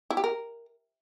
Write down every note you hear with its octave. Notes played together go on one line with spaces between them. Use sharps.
E4
G4
A#4